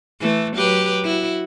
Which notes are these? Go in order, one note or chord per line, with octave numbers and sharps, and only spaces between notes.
E3 A3
F#3 G4 B4
E4 F#4